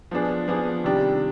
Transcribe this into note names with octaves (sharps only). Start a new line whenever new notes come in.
F3 B3 D4 G#4
F3 B3 D4 G#4
C3 D#3 G3 D4